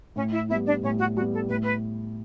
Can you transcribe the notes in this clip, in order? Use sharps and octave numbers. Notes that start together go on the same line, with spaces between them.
A2 C#4 C#5
E4 E5
G3 B3 E4 E5
D4 D5
A2 C#4 C#5
F#4
G3 B3 F#4
A4
A2 B4
B4